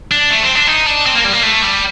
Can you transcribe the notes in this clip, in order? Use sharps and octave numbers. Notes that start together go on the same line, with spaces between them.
D4
A3
C4
D4
D#4
D4
C4
A#3
G3
A#3
A3
G3